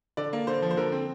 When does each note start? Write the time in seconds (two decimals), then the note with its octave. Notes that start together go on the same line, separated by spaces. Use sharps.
0.17 D3 D5
0.33 A#3
0.47 D3 C5
0.62 F3
0.71 C5
0.77 D3 A#4
0.92 C4